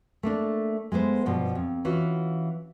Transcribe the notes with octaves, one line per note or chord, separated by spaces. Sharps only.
A3 A#3 D4
G#3 A3 B3 C5
G2 B2 F3
F2
E3 C#4 F4 F#4